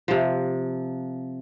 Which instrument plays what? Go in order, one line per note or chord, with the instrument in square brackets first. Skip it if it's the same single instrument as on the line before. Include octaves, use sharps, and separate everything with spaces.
[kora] C3 F3